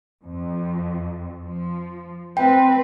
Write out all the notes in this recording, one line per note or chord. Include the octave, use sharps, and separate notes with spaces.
F2
F3
C4 B4 G5